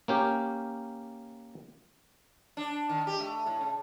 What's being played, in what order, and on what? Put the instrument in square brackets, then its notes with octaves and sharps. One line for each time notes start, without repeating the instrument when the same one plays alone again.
[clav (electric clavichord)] A#3 C#4 G4
[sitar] D4
D#3
G4
A3
A2
C#3